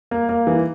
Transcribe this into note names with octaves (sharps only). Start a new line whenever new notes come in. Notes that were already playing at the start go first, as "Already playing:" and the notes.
A#3
A#3
E3